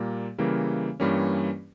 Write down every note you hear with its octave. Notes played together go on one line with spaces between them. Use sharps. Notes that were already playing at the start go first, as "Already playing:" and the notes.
Already playing: A#2 G3 A#3
C#3 E3 G3 A#3
G2 E3 G3 A#3 C#4